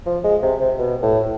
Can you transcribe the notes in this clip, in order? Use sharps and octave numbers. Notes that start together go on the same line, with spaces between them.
F3
G#3
C3
C3
B2
A2